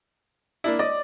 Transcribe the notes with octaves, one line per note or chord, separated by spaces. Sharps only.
A#3 D4 E4
D5 D#5